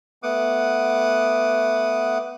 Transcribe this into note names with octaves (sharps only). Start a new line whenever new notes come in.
A3 B3 F#5 D6 D#6